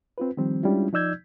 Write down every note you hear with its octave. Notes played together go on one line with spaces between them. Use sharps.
C4 F4 B4
D#3 F3 G3 C4
G3 G#3 C#4 D4 E4 F4
F3 D#4 D5 E6 G6 G#6